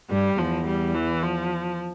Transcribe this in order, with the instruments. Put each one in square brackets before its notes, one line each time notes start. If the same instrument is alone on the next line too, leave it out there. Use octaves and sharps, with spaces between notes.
[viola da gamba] G2 [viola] G3
[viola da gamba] E2 [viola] F3
[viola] G3
E3
F3